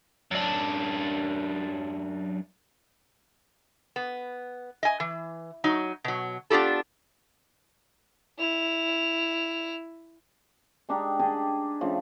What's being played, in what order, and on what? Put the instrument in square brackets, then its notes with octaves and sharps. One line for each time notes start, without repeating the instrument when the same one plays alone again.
[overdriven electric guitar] F#2 D4
[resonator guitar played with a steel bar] B3
D#5 G#5
E3
F#3 D#4
B2 F#3
B3 D4 F4 G4 A4
[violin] E4 F7
[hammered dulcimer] G#3 D4 D#4 G4
D4 G4 G#4 D#5
C#3 F3 A3 D4